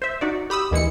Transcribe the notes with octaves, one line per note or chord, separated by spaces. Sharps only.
C5 E5
D#4 F#4 D5
G4 B5 D#6 E6
D#2 E3 G#3 C#7